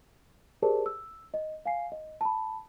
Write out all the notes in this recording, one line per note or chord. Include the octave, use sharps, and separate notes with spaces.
G4 G#4 A#4 C5 D5 A5
E6
D#5
F5 G#5 C7
D#5
A5 B5